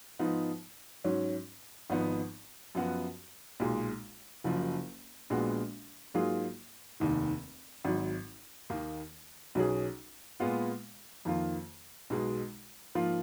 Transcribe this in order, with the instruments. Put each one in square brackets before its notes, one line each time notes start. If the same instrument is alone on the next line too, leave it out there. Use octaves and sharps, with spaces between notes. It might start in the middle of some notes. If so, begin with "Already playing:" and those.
[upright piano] G#2 F3 B3 D#4
G#2 F#3 C#4
G#1 G#2 F3 B3 D#4
F#2 F3 B3 F#4
B1 A#2 G#3
F#1 F#2 F3
A#1 A#2 G#3 B3 F#4
G#2 F#3 A#3 F4 G#4
F1 D#2 D#3
G#1 G#2 F#3
D#2 D#3 A#3
B1 B2 F#3 C#4 G#4
A#2 G#3 B3 F4
F2 D#3 A#3 F4
B1 B2 G#3
G#2 F3 A#3 F4